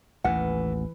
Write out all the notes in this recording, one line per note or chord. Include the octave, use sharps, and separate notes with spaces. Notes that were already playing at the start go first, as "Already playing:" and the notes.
A1 D#2 E3 F#5